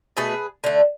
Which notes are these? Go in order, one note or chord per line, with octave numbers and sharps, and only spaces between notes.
B2 A3 G#4 B4
D3 A3